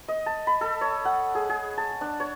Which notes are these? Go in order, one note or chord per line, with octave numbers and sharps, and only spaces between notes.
D#5
A5
B5
A4
C#5
F#5
G#4
G#4
A5
D4
C#5